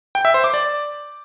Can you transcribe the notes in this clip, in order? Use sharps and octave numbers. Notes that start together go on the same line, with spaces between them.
G5
E5
C5
D6
D5